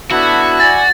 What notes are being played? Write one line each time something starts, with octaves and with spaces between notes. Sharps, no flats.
B3 D4 E4 F#4 A4
D5 G#5 A6